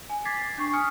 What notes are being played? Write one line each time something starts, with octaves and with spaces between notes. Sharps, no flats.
G#5
D6 G#6 A6 B6 C7
C7
D4 C#6 C7
G#5 D#6 F6 C#7